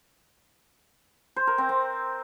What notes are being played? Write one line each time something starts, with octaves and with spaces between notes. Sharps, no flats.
C5
A#4
C4
C4